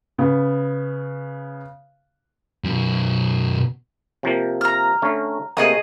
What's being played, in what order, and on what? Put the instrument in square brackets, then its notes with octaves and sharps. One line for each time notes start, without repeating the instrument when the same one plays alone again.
[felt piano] C#3 B3
[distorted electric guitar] F#2 B2
[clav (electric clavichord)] C3 F3 A#3
[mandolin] A#5 F6
[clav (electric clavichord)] D3 A3 C#4
[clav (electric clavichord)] C3 A3 A#3 [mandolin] G#4 D#5 D#6